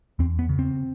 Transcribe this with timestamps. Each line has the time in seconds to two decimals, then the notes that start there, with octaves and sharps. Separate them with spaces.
0.19 E2 C4
0.39 B3
0.49 C#3
0.59 C4